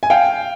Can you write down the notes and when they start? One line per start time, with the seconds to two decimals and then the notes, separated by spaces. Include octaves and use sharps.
0.03 G#5
0.10 F5 G5